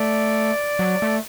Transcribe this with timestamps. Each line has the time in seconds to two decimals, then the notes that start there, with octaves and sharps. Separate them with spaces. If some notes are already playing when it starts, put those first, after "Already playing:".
Already playing: A3 D5
0.79 F#3
1.02 A3